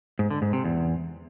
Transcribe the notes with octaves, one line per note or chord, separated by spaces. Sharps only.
G#2
D3
G#2
C3
E2